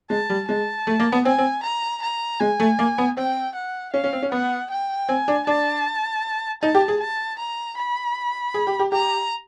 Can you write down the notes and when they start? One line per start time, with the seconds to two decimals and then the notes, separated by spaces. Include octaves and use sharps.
0.10 G#3 A5
0.30 G3
0.48 G#3 A5
0.87 A3
1.00 A#3
1.12 B3
1.25 C4 G#5
1.38 C4
1.64 A#5
2.02 A#5
2.40 G#3 G#5
2.60 A3
2.79 A#3
2.98 B3
3.17 C4 G5
3.55 F#5
3.94 C#4 F5
4.04 C#4
4.13 C4
4.22 C#4
4.32 B3 F#5
4.71 G5
5.08 C4 G#5
5.28 D4
5.47 D4 A5
6.63 D#4 A5
6.75 G4
6.88 G#4
7.00 A5
7.39 A#5
7.78 B5
8.54 G#4
8.67 G4
8.79 G4
8.92 G4 A#5